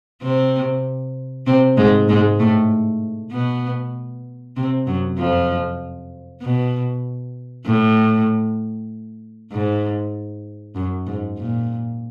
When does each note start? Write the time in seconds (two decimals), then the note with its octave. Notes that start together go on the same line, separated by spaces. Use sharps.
0.22 C3 C4
1.46 C3 C4
1.77 G#2 G#3
2.08 G#2 G#3
2.39 A2 A3
3.32 B2 B3
4.56 C3 C4
4.87 F#2 F#3
5.18 F2 F3
6.42 B2
7.66 A2
9.52 G#2
10.76 F#2
11.07 G#2
11.37 A#2